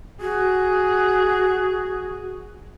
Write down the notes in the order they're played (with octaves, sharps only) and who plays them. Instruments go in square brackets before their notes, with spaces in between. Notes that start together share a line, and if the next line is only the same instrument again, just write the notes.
[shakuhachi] F#4 [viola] G#4